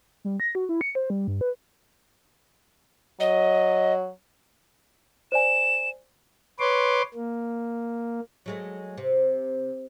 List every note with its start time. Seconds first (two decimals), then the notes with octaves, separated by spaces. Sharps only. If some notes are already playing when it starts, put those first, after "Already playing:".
0.25 G3
0.40 A#6
0.55 F#4
0.69 E4
0.81 C#7
0.95 C5
1.10 G3
1.28 G2
1.41 B4
3.20 F#3 D#5
5.32 C5 D5 G#5 E7
6.59 B4 C#5 C6 D6
7.15 A#3
8.46 F#3 G#3 A3
8.98 C3